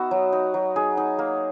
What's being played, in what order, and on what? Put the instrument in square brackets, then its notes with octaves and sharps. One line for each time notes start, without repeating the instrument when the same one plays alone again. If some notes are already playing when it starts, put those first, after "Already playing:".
Already playing: [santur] B3 D#4 F#4 E5
F#3
D#4
F#3
D#4 G#4
D#4
A#3